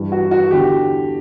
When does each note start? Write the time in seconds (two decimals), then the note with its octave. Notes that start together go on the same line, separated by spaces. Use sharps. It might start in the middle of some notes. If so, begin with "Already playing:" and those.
Already playing: G2 E3
0.12 F#4
0.31 F#4
0.51 E2 D3 G4